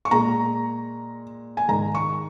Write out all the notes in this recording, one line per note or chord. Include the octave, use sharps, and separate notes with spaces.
C#6
A#2 G#3 A#5
G#5
G#2 D#3 G#3 A#5
C#6